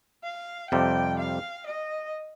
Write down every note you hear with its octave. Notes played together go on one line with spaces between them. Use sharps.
F5
F2 C3 G3 G5
F5
D#5